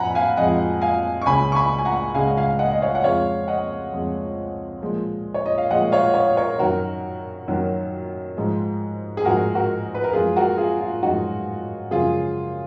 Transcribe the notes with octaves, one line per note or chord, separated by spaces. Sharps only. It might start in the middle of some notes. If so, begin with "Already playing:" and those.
Already playing: F2 F3 F#5 G#5 A#5 B5
F5 G#5
F2 F3 G#3 D#5 F#5
F5 G#5
C#6
C#2 C#3 G#3 G#5 B5
C#6
G#5 B5
G#5
F#5 A#5
C#2 C#3 G#3 F5 G#5
F5 G#5
D#5 F#5
D#5
C#5 F5
F#5
F2 F3 G#3 C#5 F5
D#5 F#5
F2 F3 G#3
A#2 F3 G#3
C#5
D#5
F5
A#2 F3 G#3 D#5 F#5
C#5 F5
C#5 F5
A#4 C#5
F#2 D#3 F#3 F#4 A#4
F#2 D#3 F#3
G#2 F3 G#3
G#4
G#2 F3 G#3 F#4 A#4
F#4 A#4
B4
A#4
F#2 F3 G#3 F4 G#4
F#4 A#4
F4 G#4
F4
F#2 F3 G#3 D#4 F#4
F#2 C#3 F3 G#3 F4 G#4